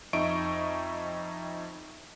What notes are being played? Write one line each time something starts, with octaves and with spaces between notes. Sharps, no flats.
F2 D#4 D#5 E5 C#6 D7